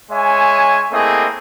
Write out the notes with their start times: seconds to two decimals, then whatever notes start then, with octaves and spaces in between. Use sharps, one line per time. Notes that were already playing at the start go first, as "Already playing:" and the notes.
0.12 G#3 C#5 E5 G#5
0.92 A3 A#3 C4 E4 G#4 D#5